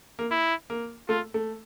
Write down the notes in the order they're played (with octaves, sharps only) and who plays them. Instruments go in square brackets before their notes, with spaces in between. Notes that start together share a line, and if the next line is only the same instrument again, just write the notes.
[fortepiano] A#3
[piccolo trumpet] E4
[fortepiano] A#3
[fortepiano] A3 [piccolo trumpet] F4
[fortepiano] A3